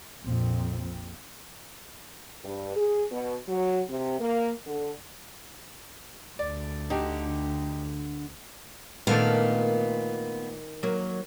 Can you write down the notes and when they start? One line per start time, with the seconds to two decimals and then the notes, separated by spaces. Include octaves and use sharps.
0.24 A#1 F2 A#2 C4
2.44 G2
2.76 G#4
3.11 B2
3.47 F#3
3.89 C3
4.19 A#3
4.66 D3
6.39 D2 D5
6.90 D3 D#4 G4
9.07 A#2 D#3 A3 B3 D4 F5
10.83 F#3 A#3